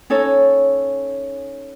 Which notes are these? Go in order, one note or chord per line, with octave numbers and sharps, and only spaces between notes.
C#4 D#4 A4 C#5